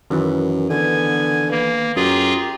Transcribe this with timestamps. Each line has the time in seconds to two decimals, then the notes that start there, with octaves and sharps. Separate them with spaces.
0.10 F#2 D#3 E3
0.70 D3 B3 G#5
1.51 A#3 B4
1.96 F#2 F4 G4 G#4 A#5